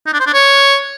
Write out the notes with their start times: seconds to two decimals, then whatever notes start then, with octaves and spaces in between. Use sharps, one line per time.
0.06 D#4
0.13 D4
0.20 C5
0.27 D4
0.33 C#5